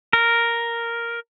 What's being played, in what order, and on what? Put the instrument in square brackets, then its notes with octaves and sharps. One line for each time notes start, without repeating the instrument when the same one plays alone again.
[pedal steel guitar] A#4